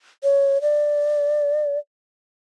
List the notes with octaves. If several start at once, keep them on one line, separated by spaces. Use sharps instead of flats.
C#5
D5